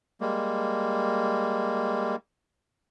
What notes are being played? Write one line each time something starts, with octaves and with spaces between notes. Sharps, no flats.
G3 G#3 A#3